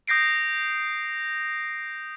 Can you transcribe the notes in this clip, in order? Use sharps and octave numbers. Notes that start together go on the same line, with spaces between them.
D#6 G6 A#6 C7 D7